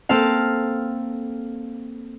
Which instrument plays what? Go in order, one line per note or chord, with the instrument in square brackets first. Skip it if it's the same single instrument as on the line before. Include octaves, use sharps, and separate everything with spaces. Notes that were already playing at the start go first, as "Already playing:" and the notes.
[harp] A#3 C4 A4 F5